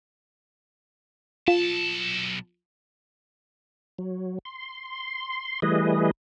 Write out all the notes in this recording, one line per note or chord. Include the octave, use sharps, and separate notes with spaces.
B1 F4 A5
F#3
C6
E3 G3 A3 G#4 B4 D#5